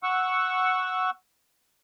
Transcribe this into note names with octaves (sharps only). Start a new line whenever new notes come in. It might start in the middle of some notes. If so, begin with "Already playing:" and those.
F#5 C#6 E6